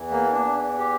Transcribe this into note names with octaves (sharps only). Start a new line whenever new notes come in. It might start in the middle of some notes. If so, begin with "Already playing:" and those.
Already playing: E2 E3
A#3
D4
G4